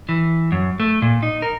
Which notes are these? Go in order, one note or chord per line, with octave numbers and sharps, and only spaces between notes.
E3
F#2
A3
A#2
D#4
A#4